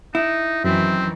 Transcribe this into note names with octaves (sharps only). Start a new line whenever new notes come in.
D#4 E4
F#2 D#3 E3 C4